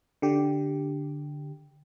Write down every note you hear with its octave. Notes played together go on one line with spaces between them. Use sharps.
D3 G4